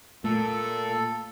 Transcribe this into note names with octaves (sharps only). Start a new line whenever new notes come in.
A#2 A3 A4